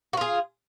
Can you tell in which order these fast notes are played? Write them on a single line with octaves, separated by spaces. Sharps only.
F#4 F4 G#4